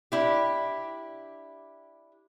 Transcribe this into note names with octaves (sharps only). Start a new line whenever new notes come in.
D4 E4 G4